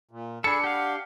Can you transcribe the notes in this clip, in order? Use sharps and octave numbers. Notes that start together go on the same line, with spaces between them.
A#2
D4 G#4 A4 B5 C#7
G4 F5 F#5